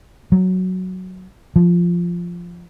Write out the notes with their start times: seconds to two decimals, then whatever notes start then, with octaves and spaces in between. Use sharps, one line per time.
0.32 F#3
1.56 F3